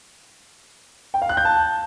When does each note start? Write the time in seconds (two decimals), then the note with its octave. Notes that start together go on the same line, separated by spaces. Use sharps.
1.14 G5
1.22 F5
1.29 F#6
1.37 G6
1.45 A5